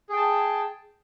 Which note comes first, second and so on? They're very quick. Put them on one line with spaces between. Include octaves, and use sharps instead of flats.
G#4 G5 A5